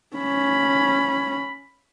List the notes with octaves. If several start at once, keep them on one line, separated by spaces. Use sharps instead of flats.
C#4 B5